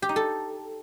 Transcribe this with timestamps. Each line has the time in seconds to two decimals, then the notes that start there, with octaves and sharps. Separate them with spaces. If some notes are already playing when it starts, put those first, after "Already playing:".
0.02 G4
0.09 D#4
0.16 A4